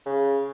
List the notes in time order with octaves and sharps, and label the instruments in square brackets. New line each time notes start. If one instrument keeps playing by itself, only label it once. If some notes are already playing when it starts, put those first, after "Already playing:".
[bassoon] C#3